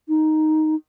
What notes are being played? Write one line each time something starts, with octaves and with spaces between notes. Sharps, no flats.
D#4